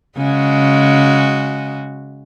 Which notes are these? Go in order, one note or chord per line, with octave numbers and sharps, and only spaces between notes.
C#3 G#3 F#4